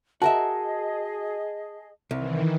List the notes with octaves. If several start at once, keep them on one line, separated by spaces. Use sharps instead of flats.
F#4 G#4 A#4 D#5 E5 A5
C2 D#3 E3